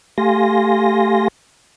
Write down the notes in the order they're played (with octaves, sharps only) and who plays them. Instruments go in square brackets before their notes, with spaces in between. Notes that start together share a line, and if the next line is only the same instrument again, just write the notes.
[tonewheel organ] A3 G4 F5 G#5 C6 A#6